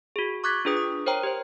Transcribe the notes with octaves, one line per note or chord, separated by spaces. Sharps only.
F#4 G#4
C#6 D6 F#6 G#6 A6 B6
D4 F4 G#4 B4 D#6
D#6
A#4 C5 C#5 G5 A#5
G4 C5